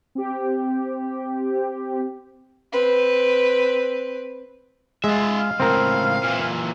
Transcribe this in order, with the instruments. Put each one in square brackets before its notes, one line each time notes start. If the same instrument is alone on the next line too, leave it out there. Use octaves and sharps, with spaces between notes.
[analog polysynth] C4 G4
[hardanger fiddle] C4 B4
[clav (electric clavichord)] G#3 [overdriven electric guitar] F4 E5
[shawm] F5
[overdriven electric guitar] C#2 A2 [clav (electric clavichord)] C4 A#4
[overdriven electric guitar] A#2 E3